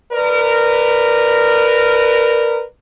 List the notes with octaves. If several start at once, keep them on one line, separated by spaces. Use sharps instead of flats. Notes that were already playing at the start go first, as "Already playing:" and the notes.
A#4 B4 D5